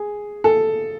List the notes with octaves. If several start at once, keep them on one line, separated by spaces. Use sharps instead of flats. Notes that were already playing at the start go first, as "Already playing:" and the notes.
Already playing: G#4
A4